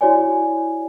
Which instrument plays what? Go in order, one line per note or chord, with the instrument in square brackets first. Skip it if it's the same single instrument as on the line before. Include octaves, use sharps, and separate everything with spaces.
[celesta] E4 F#4 C#5 D5 G#5